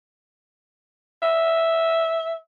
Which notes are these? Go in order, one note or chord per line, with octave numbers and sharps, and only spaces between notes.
E5